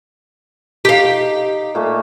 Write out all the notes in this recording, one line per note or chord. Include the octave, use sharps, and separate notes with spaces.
D#4 G4 F5
A#2 A3 D#5